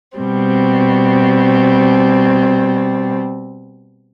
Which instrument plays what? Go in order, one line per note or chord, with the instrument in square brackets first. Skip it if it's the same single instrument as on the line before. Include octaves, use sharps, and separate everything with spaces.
[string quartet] B2 G3 C4